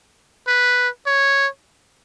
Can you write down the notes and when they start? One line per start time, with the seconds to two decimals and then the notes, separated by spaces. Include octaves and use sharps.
0.47 B4
1.07 C#5